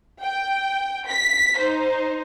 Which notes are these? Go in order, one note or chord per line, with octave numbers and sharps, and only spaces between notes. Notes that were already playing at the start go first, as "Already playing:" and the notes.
G5
B6
D#4 C5